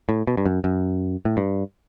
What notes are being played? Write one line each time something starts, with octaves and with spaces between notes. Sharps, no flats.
A2
B2
G2
F#2
F#2
A2
G2